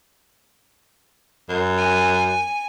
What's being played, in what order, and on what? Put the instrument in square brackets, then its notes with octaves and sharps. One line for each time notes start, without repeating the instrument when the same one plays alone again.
[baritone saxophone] F#2
[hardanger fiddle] G#5